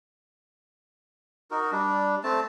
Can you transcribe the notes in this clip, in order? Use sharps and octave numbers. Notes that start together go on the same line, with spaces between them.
D#4 F#4 A#4
G3 D4
A3 C4 A5